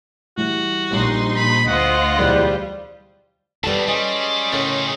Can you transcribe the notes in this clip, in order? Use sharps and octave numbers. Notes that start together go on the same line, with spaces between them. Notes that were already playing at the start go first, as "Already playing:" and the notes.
E3 G3 F#4
A#1 A#2 G3 D#4 C6
B5
D2 F4 C5 D#5 F5 F#5 C#6 C#7
B1 E2 E3 G3
B2 D#3 G3 A4 B4 A5
G3 C#4 G#4 D#5 C6
A2 C#3 A3 D#4 A#4